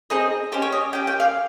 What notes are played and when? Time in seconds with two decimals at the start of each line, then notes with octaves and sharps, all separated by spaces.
0.10 C4 D#4 G#4 D#5
0.52 C#4 G4 C5
0.62 C#5
0.72 D#5
0.93 C#4 G4 G5
1.07 G5
1.20 F5